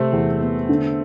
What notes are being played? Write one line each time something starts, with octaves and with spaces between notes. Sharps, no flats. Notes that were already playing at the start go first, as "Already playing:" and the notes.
Already playing: C3 A3 C4
E2
B3
D3